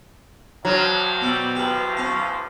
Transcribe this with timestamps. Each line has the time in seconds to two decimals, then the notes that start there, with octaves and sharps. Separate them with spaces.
0.65 G2 F3 F#3
1.21 B2 G3 C4 F#5
1.55 C#2 E3 F3 G4 B4
1.97 C#4 F5 A#5